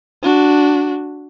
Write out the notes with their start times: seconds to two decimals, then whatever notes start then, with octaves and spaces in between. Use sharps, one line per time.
0.22 D4 F#4